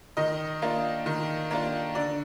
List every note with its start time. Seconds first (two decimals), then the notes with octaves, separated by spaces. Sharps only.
0.17 D#3 D#5
0.62 A#3 D4 F4
1.06 D#3
1.51 A#3 D4 F4
1.95 D3 D5